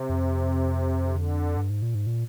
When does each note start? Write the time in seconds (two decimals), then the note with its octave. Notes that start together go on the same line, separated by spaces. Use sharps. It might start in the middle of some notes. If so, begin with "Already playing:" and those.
Already playing: C3
0.09 F2
1.08 D3
1.57 G2
1.70 G#2
1.82 A#2
1.95 G#2
2.07 A#2